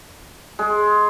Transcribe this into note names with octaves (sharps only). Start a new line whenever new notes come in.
G#3